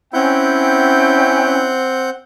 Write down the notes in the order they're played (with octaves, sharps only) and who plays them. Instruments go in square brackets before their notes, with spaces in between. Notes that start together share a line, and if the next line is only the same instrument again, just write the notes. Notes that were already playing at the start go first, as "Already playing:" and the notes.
[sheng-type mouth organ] C4 F#5 G6 [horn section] C#4 G5 [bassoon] E4